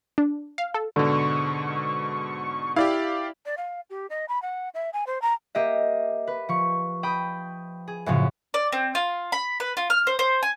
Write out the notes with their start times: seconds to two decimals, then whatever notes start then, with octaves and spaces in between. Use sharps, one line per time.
0.18 D4
0.58 F5
0.74 A4
0.96 G#2 B2 D3 C#6
2.76 E4 G4 D5 F5
3.46 D5
3.57 F5
3.90 G4
4.10 D#5
4.29 B5
4.42 F#5
4.74 E5
4.93 G#5
5.07 C5
5.22 A#5
5.55 A#3 G4 D#5 E5
6.27 B4
6.49 F3 C#6
7.03 G5 B5 D#6
7.88 G#4
8.06 F#2 A2 C#3 F3 C#4
8.54 D5
8.72 C4
8.95 F4
9.32 B5
9.60 B4
9.77 F4
9.90 F6
10.07 C5
10.19 C5
10.43 G#5